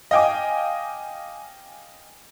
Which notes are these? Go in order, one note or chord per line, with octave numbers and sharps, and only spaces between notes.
D#5 F5 G5 G#5 D6